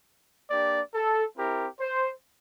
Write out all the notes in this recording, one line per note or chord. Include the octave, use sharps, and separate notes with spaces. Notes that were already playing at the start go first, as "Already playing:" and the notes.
A#3 D4 G4 D5
A4
C4 E4 G4 A#4
C5